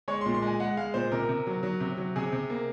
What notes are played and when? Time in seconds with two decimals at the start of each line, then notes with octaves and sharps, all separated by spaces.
0.08 G#3 C#5
0.21 C6
0.26 A#2
0.34 C6
0.42 G#3 G#5
0.60 G#3 F#5
0.77 G#3 F5
0.94 A#2 C5
1.12 C3 A#4
1.29 C3
1.47 F#3
1.63 F#3
1.80 C3
1.97 F#3
2.16 C3 G#4
2.32 C3
2.50 A#3